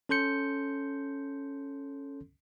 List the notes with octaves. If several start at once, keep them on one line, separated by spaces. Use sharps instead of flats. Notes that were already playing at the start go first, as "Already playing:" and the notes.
C#4 A4 C6 G6 C#7